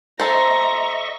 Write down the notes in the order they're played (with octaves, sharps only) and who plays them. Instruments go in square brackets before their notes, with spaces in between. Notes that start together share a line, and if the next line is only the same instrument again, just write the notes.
[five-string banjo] A4 C5 [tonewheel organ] D#5 E5 C#6 [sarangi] A#5